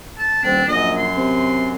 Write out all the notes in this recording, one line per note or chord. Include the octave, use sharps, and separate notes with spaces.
A5
D#1 C4 D4
A#1 F#2 D#5
C6
C3